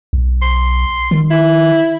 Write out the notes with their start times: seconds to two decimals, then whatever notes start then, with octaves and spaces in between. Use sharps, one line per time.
0.13 B1
0.42 C6
1.11 D#3
1.30 E4